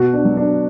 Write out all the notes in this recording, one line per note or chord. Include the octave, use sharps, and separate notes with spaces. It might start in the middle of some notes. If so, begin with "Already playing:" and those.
Already playing: B2 F#4
D4
F#3
D4